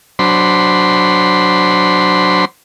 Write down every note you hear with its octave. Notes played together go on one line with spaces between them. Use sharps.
F#3 D4 C5 B5 C6